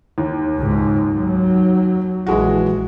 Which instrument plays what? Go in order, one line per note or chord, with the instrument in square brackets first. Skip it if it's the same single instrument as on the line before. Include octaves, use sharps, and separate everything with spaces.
[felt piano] D#2
[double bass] C#2 G#2
F#3
[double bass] A#1 [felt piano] E3 G#3 F#4